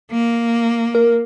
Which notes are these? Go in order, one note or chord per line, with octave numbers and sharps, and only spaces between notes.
A#3
A#4